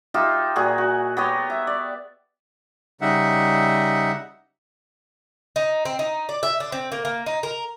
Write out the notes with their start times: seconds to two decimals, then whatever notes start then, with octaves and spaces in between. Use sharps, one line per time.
0.14 D#4 F4 G4 E5
0.56 A#2 F#4 G#4
0.78 F#4
1.17 B3 G4 C#5 D#5
1.50 E5
1.67 D5
3.01 C#3 G3 D#4 E5 F#5
5.56 D#4
5.85 C4
5.99 D#4
6.29 D5
6.43 E5
6.60 D4
6.72 C4
6.92 A#3
7.05 A#3
7.26 D#4
7.43 A#4